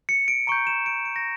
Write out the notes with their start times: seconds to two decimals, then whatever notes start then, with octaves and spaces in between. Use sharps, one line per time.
0.09 C#7
0.28 D7
0.47 A#5 C#6 G6 D7
0.67 E7
0.86 D7
1.05 D7
1.16 A#6